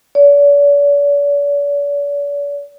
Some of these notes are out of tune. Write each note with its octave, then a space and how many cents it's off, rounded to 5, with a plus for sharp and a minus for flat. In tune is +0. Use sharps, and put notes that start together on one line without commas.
D5 -45